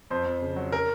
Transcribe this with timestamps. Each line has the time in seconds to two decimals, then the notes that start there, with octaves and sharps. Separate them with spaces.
0.10 F2 C5
0.26 F2
0.42 C#3
0.56 F#3
0.72 A#4